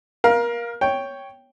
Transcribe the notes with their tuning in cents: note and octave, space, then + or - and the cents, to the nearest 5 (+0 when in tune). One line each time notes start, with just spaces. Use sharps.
A#4 +25 F5 +0
C#5 +0 G5 +0